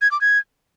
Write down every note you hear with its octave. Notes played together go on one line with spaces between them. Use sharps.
G#6
D6
G#6